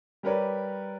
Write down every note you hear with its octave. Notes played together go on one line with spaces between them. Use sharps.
G3 G4 A#4 B4 C#5 D5